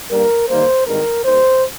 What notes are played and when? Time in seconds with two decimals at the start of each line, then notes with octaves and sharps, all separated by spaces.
0.11 G2 G3 A#3 A#4
0.48 D#2 D#3 G3 A#3 C5
0.87 G#1 G2 D#3 G#3 A#4
1.25 D#2 D#3 G3 C5